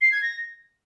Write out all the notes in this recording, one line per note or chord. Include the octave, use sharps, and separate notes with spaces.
C7
G#6
A#6